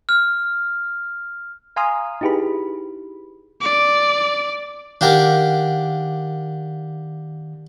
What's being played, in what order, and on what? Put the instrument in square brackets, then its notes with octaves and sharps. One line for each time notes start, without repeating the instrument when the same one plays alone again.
[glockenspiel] F6
[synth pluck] F5 G#5 A#5 C6 D#6 F6
D#4 E4 G4 G#4 B4 B5
[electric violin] D5
[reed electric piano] D#3 F5 F#5 [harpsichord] D4 G4 A#4